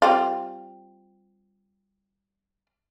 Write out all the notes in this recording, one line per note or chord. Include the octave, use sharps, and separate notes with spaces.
G3 C4 F4